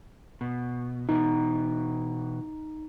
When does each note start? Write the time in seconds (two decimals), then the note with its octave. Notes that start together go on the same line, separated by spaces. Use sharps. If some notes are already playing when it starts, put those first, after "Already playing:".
0.41 B2
1.09 B2 E3 D#4